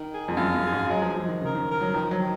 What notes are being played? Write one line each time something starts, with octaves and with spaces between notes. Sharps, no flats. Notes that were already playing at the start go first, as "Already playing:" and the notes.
Already playing: D#3
G#4
F2
F#2 F4
F#2
G#4
G#2
F#3 G#3
F3
F3 G#3
D#3
C#3 A#4
D#3
A#4
F#3
D#3 F3
F#3
D#3